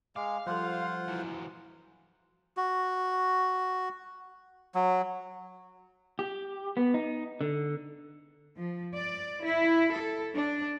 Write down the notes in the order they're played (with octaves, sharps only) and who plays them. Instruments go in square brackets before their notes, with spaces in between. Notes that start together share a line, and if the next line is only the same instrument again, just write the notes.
[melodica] G#3 [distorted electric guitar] F5 [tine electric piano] D6
[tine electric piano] F3 G3 A4 [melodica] F4 C5 F#5
[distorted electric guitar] E3 F#3
[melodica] F#4
F#3
[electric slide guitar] G4
B3
D#4
D3
[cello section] F3
D5
E4
A4
D4